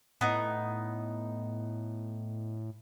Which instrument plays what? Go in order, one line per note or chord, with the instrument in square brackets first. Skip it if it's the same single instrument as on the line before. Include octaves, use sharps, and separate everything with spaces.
[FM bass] A2 [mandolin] B3 D#4